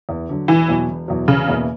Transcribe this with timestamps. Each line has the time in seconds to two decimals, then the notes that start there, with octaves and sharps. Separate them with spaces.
0.09 E2
0.29 D3 F#3
0.48 E1 E3
0.68 E2 B2 F#3
0.89 E1
1.08 E2 B2 F#3
1.28 E1 C#3
1.49 E2 B2 A#3 E4